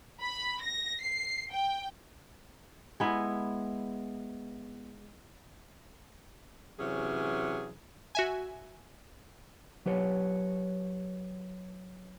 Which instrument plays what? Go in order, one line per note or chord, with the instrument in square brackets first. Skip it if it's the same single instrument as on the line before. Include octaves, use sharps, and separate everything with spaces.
[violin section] B5
A#6
C7
G5
[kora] G#3 B3 E4
[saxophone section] C3 E3 F#3 C#4 G#4
[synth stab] F#4 E5 G#5
[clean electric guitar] F#3 G4 B4 C#5